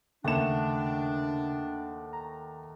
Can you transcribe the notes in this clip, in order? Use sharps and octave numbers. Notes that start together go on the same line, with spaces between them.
D#2 C#3 A3 D4 F#5 A5 E7
A#5